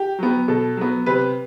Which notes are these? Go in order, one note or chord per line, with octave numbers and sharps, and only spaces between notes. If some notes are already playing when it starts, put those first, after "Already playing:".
Already playing: G4
F#3 B3
B2 A4
F#3 B3
C3 B4